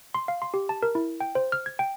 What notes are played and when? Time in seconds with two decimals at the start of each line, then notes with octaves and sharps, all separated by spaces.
0.14 C6
0.28 F5
0.42 C6
0.54 G4
0.69 A5
0.83 A#4
0.95 E4
1.20 G5
1.35 C5
1.52 F6
1.66 G#6
1.79 G5